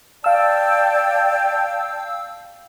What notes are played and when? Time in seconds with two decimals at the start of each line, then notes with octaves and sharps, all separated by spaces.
0.24 D5 F5 G5 A5 E6